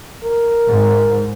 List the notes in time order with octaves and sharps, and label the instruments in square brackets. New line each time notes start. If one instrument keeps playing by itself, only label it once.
[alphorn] A#4
[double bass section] G#2